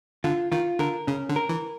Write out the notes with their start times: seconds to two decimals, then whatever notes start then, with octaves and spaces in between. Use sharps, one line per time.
0.24 D3 F4
0.52 D#3 F4
0.79 D3 A#4
1.07 C#3 C#4
1.29 D3
1.36 A#4
1.49 E3